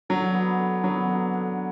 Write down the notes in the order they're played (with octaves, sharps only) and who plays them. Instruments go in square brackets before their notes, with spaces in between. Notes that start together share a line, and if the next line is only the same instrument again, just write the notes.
[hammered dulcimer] D3 [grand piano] F#3
[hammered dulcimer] B3
D3
[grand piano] F#3 [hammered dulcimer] B3
[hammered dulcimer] D3
D3